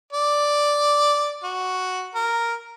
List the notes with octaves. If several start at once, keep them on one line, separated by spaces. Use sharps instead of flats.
D5
F#4
A#4